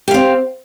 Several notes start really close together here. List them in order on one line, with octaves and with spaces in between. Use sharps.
G4 F5 C4